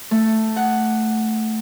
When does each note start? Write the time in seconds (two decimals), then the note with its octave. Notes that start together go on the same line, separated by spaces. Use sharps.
0.11 A3
0.56 F#5